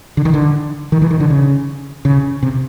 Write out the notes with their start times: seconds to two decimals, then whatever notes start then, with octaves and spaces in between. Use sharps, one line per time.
0.17 D3
0.25 D#3
0.34 D3
0.92 D#3
1.02 E3
1.11 D#3
1.20 D3
1.30 C#3
2.05 C#3
2.43 C3